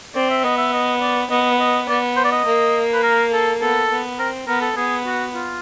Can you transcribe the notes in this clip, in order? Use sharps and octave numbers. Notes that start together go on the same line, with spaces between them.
C4 D5
E5
B3 D#5
E5
D#5
D5
B3 D#5
D#5
B3 D5
C5
D5
D#5
A#3
B4
A#4
A4
B3 A4
B3
C4 A#4
B3 A#4
A4
B3 G#4
F#4
F4